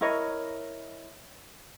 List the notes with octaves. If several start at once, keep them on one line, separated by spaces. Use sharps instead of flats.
E4 A#4 C#5 D#5